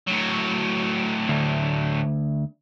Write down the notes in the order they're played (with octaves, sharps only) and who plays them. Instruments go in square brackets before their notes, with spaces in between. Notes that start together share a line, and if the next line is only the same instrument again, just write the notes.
[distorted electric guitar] A2 F#3
[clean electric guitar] D2